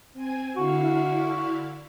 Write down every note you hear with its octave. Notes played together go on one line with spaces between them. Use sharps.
C4 G#5 G#6
D3 E4 F#4 F5